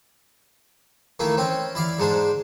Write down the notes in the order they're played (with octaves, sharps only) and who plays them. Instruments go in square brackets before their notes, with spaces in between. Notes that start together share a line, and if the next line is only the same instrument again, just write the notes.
[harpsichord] D#3 A3 A#3 E4
C4 C#4
E4 D5 F5
G#2 G#3 D4 C5